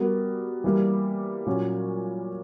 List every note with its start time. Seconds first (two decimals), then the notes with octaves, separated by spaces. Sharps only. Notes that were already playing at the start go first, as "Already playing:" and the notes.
Already playing: G3 B3 F#4 A#4
0.64 E3 G3 A#3
1.47 A#2 F#3 C#4